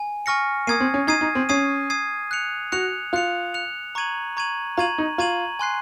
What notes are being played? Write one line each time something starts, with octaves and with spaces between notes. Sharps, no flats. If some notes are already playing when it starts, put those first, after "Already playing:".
Already playing: G#5
G#5 C#6 F6 A#6 C#7
A#3 D#6 G#6 C7 D#7
C4
C#4
D#4 D#6 G#6 C7 D#7
D#4
C4
C#4 D#6 G#6 C7 D#7
D#6 G#6 C7 D#7
F#6 C#7 F7
F#4 F#6 C#7 F7
F4 F#6 C#7 F7
F#6 C#7 F7
A#5 C#6 G#6 D#7 F#7
A#5 C#6 G#6 D#7 F#7
F4 A#5 C#6 G#6 D#7 F#7
D#4
F4 A#5 C#6 G#6 D#7 F#7
G#5 C6 F#6 C7